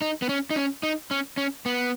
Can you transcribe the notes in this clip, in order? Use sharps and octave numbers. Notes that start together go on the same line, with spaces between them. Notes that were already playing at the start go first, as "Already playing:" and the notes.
D#4
B3
C#4
D#4
C#4
D#4
C#4
C#4
B3